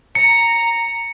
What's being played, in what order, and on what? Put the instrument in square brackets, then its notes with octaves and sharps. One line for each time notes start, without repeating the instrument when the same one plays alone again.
[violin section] A#5 [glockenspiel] C#7